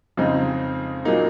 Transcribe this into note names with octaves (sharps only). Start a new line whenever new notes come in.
F2 C#3 G#3 C4 D#4
A#2 F#3 A#3 D#4